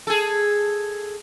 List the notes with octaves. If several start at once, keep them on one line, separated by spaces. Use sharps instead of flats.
G#4 A4